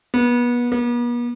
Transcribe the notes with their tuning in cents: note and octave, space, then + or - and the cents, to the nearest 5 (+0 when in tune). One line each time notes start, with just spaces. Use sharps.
B3 -30
B3 -45